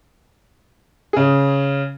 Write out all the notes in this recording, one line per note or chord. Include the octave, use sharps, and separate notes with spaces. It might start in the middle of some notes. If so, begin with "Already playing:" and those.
C#3 G#4